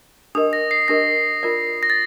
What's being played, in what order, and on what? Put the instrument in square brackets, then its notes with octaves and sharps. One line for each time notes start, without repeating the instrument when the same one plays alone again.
[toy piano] D4 G4 A#4 D#5 [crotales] D#6
[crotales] A#6
C7
[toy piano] D4 G4 A#4 D#5 [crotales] A#6
[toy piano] F4 A#4 D5
[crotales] A#6
A6